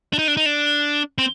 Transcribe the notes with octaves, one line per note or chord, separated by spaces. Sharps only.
D4
D#4
D4
D#4
D4
C4